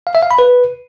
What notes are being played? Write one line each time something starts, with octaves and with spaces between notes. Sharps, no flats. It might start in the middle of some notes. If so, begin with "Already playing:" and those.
F5
E5
F5
B5
B4